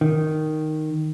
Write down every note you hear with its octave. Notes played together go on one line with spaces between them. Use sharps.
D#3